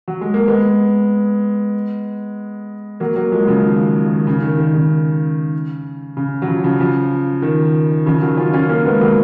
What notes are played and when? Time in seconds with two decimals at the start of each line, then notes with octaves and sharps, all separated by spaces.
0.08 F#3
0.21 G#3
0.34 A#3
0.47 G#3 B3
3.00 F#3 A#3
3.16 F#3 A#3
3.32 F3 G#3
3.47 C#3 F3
3.64 D#3
4.06 D#3
4.27 C#3
4.42 D#3
4.58 D#3
4.74 C#3
6.17 C#3
6.42 F#3
6.48 C#3 F3
6.64 C#3 F3
6.79 C#3 F3
7.42 D#3
8.06 C#3 F3
8.21 D#3 F#3
8.37 C#4 F4
8.53 C#4 F4
8.69 A#3 C#4
8.85 G#3 B3
9.01 F#3 A#3